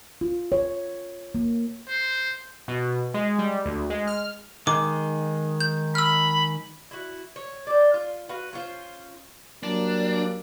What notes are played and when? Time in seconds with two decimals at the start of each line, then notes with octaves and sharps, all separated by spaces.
0.21 F4
0.52 C#5
1.35 A#3
1.88 C5
2.68 B2
3.14 G#3
3.39 G3
3.65 D2
3.90 G#3
4.07 F6
4.67 D#3 G#3 D6
5.60 G6
5.95 B5 E6 F6
6.91 E4 F#4
7.36 C#5
7.67 C5 D5
7.94 F4
8.29 F#4 B4 F5
8.53 C#4 F4 C5
9.63 F#3 G3 A#3 D4